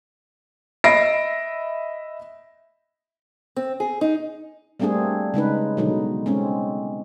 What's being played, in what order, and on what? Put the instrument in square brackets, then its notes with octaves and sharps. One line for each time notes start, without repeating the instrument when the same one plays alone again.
[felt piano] D#5 E5 B5 A#6 C7 D7
[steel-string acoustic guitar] C4
G#4
D#4
[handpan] G3 A3 A#3 C4 D4 G#4
C#3 G#3 D#4 B4
B2 D3 F#3 G#3 D#4
G#3 C4 C#4